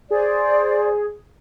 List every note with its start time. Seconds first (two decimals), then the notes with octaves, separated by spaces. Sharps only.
0.11 G#4 C5 D5